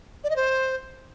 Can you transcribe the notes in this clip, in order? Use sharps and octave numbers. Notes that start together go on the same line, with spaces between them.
D5
D#5
C5